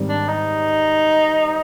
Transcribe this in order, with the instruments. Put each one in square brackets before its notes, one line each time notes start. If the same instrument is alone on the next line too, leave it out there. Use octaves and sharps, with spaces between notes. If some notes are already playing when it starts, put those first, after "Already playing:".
Already playing: [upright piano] G#2 D#3 G3 C4
[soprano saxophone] D4
D#4